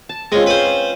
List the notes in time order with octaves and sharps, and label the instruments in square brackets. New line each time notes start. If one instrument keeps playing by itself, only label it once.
[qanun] A5
[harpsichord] G#3 [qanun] C4 C#4 F4
[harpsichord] B4 C5